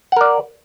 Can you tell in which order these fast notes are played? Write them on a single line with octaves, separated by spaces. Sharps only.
F#5 A#4 D5